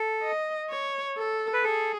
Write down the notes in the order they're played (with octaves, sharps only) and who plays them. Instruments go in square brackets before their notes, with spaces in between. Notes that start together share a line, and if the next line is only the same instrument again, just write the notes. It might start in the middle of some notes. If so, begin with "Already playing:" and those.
Already playing: [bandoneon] A4
[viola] D#5
C#5
A4
[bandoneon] B4
[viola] G#4 [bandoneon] A4